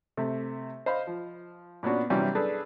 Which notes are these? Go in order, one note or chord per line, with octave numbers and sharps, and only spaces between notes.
C3 A3
C5 D#5 F5 B5
F3
A#2 B3 C#4 D4 F#4
C3 E3 F#3 G3 C#4 D4
D4 G#4 A4 B4